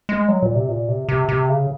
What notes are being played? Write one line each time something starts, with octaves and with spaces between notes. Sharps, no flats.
G#3
F#3
A#2
C3
A#2
C3
C3
C3
C#3